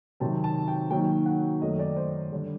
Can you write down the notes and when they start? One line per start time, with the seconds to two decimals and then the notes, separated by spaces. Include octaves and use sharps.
0.20 C3 D#3 F#3 C4 A5
0.44 A5
0.68 G5
0.90 D#3 F#3 A#3 D#4 G5
1.26 F#5
1.62 F#2 D#3 A3 D#5
1.79 D5
1.96 C5
2.32 D3 G3 D4